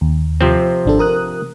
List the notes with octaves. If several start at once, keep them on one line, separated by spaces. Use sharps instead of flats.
D#2
C3 F3 C4
G#1 D4 A4
A#4 D#6 F#6